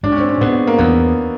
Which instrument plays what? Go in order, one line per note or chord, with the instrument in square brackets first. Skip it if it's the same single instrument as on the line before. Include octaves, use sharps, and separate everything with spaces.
[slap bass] G#2 [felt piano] D4
[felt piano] C#4
C4
C#4
[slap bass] G#2 [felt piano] B3
[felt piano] A#3
[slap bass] E2 [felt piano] B3